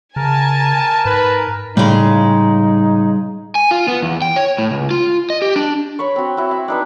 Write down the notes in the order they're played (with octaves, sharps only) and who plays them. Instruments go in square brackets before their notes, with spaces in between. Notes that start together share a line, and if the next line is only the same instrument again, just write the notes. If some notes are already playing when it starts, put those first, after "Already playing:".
[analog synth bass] C#3 [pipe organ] A#4 [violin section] G#5 A5
[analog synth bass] G#2 [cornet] B4
[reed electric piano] A2 [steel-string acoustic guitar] C#3 G#3 [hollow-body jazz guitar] G3 B5 [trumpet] D#4
[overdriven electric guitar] G#5
F4
B3
E2
G5
C#5
A2
C#2
F4
D#5
G4
D4
[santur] C#5 B5 C#6
C4 F#4
E4 F#4
E5
D4 D#4 B4